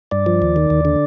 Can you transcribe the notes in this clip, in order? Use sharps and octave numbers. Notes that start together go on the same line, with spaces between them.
G2 D5
F3
D#2
D#3
D#2
D3